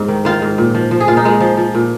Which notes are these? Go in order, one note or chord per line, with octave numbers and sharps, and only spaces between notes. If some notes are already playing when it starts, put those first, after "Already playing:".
Already playing: G#2
D#3
D#3 F4
G#2
A#2
F3
F3
G#4
A#2 F4
D#4
A#2 G#3
F3
F3
A#2